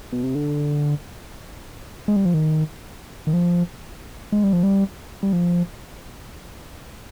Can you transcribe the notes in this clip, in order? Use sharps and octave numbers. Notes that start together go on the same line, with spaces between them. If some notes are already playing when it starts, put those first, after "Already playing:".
B2
C3
D3
G#3
G3
F3
D#3
D#3
F3
G#3
G3
F3
G3
G3
F3